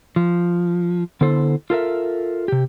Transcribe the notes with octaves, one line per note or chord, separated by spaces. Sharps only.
F3
D3 B3 E4 A4 C5
F4 A4 A#4 E5
C3 G4